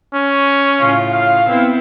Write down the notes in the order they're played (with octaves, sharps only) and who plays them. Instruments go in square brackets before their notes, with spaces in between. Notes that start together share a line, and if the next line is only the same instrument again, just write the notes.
[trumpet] C#4
[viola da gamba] A2 C#3 F4
[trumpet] F5
[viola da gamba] B3 C4 E4